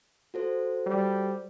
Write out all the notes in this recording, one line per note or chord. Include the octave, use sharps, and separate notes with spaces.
F#4 A4 C5
G3